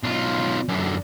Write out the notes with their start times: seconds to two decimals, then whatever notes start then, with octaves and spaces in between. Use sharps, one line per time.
0.04 B1 F4
0.68 F#2 D3